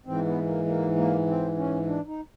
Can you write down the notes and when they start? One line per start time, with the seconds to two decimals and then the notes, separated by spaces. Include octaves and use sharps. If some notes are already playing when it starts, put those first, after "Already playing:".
0.06 G#2 E3 C4
0.26 B3
0.46 A#3
0.66 A#3
0.96 A#3
1.26 C4
1.57 C#4
1.86 D4
2.07 D#4